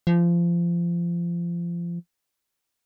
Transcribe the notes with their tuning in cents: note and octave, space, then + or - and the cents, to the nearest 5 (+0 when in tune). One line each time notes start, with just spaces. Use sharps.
F3 -25